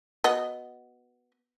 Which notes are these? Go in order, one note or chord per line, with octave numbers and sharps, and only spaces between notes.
B3 F#4 D#5